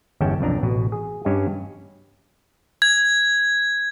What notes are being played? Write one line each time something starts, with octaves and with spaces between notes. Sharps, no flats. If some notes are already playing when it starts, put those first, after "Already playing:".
G1 E2 G#3 C#4 G5 A5
B1 F2 D4 A#5
A1 B2
G#4
G2 C#4 G4 D#5 G#5
G#6